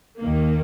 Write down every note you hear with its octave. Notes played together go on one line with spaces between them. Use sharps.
D#2 D#3 A#3